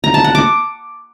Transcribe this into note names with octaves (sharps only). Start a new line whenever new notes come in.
A#5
A5
F#5
D6